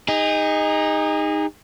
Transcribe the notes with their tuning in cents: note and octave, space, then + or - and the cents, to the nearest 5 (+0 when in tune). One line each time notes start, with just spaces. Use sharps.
D#4 +0 G#4 -35